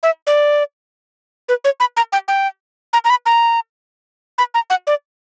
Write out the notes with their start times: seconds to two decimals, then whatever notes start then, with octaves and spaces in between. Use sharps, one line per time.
0.03 E5
0.27 D5
1.49 B4
1.64 C#5
1.80 B5
1.97 A#5
2.12 G5
2.28 G5
2.93 A#5
3.04 A#5
3.10 B5
3.26 A#5
4.38 B5
4.54 A#5
4.70 F#5
4.87 D5